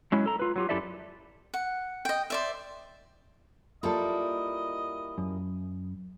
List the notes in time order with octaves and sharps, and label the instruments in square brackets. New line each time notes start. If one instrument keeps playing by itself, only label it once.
[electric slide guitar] F#3 G#3 C#4 E4
A4 A#5
F4 B4
F#3 F4 G4
F#2 E4 G4 A4 D5 E5
[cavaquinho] F#5
D#5 G5
C5 D5 E5
[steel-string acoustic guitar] G3 A#3 E4 [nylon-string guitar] F4 A4 [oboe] D#5
[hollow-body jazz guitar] F#2